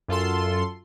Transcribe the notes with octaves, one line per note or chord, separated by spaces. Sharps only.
F#2 F4 A4 C6